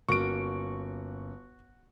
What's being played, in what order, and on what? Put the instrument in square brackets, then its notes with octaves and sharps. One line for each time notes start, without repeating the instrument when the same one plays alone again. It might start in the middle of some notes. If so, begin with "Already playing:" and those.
[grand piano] G1 [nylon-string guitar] A#3 C#4 [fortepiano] F#4 [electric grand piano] C#6 D7